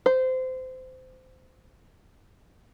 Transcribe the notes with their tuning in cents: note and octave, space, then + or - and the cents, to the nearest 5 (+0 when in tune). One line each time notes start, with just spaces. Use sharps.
C5 -20